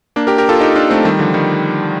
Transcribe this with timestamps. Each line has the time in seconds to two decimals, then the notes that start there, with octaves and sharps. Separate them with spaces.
0.16 A#3 D4
0.27 G4 A#4
0.38 G4 A#4
0.49 F4 A4
0.61 D#4 G4
0.75 D4 F4
0.89 A3 C4
1.05 D#3 G3
1.19 D3 F3
1.34 D#3 G3